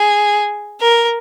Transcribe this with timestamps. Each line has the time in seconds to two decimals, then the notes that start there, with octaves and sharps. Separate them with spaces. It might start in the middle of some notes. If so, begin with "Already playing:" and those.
Already playing: G#4
0.81 A#4